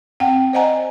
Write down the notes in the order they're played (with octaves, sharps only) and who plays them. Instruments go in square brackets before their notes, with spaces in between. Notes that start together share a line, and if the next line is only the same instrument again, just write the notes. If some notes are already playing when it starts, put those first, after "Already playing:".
[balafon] C4 F#5 G5
C5 D5 D#5 F#5 G#5 A#5